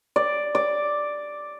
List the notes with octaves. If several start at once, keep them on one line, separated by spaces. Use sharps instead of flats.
D5
D5